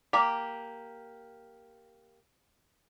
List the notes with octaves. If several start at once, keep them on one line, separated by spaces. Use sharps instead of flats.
A#3 G4